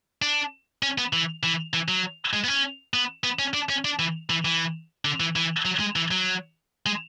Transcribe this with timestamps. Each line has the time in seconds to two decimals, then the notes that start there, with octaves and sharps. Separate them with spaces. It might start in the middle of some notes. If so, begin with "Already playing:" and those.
0.22 D4
0.83 C#4
0.98 B3
1.13 E3
1.43 E3
1.74 E3
1.88 F#3
2.33 G#3
2.44 B3
2.48 C#4
2.94 B3
3.24 B3
3.39 C#4
3.54 D4
3.70 C#4
3.85 D4
3.99 E3
4.30 E3
4.45 E3
5.05 D3
5.20 E3
5.36 E3
5.65 F#3
5.80 G#3
5.96 E3
6.11 F#3
6.86 G#3